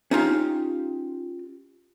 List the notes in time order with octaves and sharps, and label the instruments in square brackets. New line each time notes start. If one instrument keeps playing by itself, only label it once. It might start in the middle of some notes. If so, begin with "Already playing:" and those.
[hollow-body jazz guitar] C#4 D#4 F4 G4